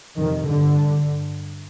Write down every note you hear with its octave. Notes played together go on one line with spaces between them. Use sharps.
F2 C3 D#3
G2 D3
G2